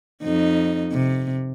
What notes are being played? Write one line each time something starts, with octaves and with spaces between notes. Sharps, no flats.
F2 D#4
C3